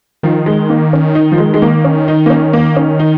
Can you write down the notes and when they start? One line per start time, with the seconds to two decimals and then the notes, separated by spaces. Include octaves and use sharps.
0.23 D#3 F3
0.46 G#3
0.70 A#3
0.93 C#4
1.15 D#4
1.32 F3
1.38 G#3
1.54 G#3
1.62 A#3
1.85 C#4
2.08 D#4
2.26 A#3
2.30 C#4
2.53 A#3
2.76 C#4
2.99 D#4